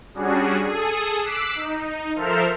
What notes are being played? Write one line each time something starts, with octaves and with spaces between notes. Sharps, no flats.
G3 C#4 D4 F#4 G#4
G#4 A4 D#6
D6 E6 F#6 B6 C7 E7
D#4
F3 A4 A#4 C5 E5 F6